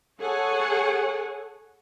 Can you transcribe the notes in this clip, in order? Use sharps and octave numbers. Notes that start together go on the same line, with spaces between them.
G#4 A4 C#5 F#5 G#5